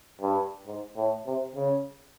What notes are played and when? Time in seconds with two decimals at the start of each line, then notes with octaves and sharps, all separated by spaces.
0.21 G2
0.66 G#2
0.96 A2
1.26 C3
1.56 C#3